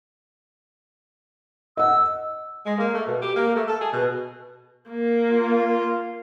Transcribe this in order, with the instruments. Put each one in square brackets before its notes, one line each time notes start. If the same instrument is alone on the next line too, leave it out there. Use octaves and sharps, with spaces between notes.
[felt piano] D#5 F#5 [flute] E6
[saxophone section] G#3
A#3
A3
B2
G4
A#3
A3
A4
G#4
B2
[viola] A#3
[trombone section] F4